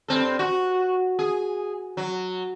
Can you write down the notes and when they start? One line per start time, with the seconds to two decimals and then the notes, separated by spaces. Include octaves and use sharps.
0.08 G2 C4 A4
0.39 F#4
1.19 G#4
1.97 F#3